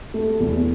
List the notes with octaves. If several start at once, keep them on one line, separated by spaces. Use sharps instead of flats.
A3
E2